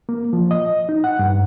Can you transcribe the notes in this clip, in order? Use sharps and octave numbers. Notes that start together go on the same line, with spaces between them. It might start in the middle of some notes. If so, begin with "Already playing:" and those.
A#3
F3
D#5
D#4
F#5
G2